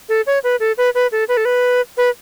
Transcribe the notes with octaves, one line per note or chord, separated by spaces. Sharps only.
A4
C#5
B4
A4
B4
B4
A4
B4
A4
B4
B4